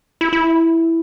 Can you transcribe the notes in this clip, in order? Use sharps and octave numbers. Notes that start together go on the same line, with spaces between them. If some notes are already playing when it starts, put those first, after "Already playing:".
E4
E4